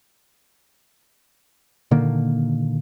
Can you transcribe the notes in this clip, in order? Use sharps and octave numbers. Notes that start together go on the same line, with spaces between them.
A#2 D3 D#3 A#3